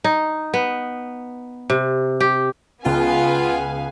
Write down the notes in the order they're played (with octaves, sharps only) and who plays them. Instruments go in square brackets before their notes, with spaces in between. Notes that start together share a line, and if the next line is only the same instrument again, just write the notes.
[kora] D#4
B3
C3
G4
[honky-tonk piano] C#2 [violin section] B3 F5 G#5 [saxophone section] F4